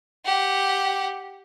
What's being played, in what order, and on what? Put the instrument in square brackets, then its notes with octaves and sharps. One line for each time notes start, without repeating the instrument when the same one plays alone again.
[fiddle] G4 F#5